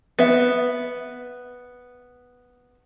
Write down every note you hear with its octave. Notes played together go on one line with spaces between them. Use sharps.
B3 E5